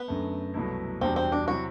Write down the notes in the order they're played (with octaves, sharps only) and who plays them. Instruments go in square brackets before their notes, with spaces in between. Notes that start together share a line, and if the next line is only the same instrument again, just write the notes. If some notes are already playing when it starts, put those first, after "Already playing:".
Already playing: [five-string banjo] B3
[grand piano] F#2 D3 A3
C2 B2 F#3 A3 E4
[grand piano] E2 B2 G3 D4 F#4 [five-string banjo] C4
[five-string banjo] C4
D4
[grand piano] C3 F#3 C4 E4 [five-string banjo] F#4